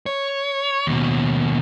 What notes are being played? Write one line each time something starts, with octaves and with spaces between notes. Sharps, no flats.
C#5
D#2 B2